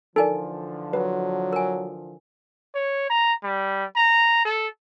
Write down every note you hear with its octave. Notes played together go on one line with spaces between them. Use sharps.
D3 E3 F3 D#4 A4 A#4 D5 G#5
F#3 B4
A#4 G#5
C#5
A#5
G3
A#5
A4